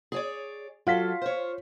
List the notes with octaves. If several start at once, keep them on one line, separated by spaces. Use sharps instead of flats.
G#4 C#5 D5
F#3 F4 A4 F5 B6
C5 C#5